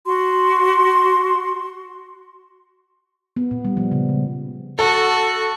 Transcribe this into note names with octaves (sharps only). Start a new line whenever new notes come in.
F#4 C6
B3
A#2
G3
F3
C#3
G#3
F#4 A4